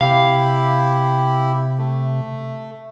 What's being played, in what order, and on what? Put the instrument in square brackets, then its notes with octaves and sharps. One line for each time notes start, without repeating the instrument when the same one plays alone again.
[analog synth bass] C3 [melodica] E4 G4 [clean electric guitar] F5
[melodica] A3